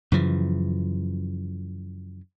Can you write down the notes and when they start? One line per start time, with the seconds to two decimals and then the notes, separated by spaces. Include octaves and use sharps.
0.12 F#2 C#3 E3 F3